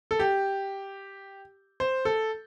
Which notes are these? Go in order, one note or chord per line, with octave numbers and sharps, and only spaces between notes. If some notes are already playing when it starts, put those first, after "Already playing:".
A4
G4
C5
A4